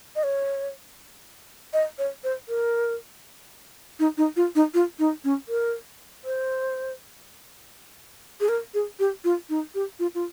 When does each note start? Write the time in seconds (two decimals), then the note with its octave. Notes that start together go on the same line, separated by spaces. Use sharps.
0.16 D#5
0.24 C#5
1.73 D#5
1.99 C#5
2.24 C5
2.49 A#4
3.99 D#4
4.18 D#4
4.36 F4
4.55 D#4
4.74 F4
4.99 D#4
5.24 C#4
5.49 A#4
6.24 C5
8.40 G#4
8.49 A#4
8.74 G#4
8.99 G4
9.24 F4
9.49 D#4
9.75 G4
9.99 F4
10.15 F4